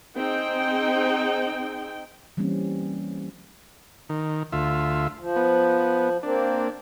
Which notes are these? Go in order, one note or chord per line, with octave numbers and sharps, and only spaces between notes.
C4 D#4 G#4 G5
E3 G3 A#3 C4 C#4
D#3
D2 F4 E5
F3
B3
A#3 C4 D4